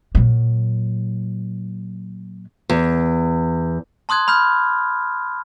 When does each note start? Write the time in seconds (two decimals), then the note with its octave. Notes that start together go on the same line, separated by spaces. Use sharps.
0.15 A#2 F#3
2.69 E2
4.09 A5 C6 D#6 F#6 G#6
4.28 B5 F6 G6